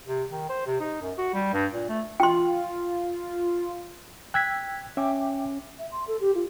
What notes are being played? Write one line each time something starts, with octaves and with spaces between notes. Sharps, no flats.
C3
D#3
C5
C3
D#4
F#2
F#4
G3
G2
A#2
A3
F4 G5 C6
G5 E6 F#6 G#6 B6
C#4 E5 G5 D6
E5
C6
A4
G4
F4